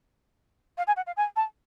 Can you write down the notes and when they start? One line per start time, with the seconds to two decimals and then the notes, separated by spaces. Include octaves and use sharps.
0.78 F5
0.87 G#5
0.96 F#5
1.07 F5
1.17 G#5
1.36 A5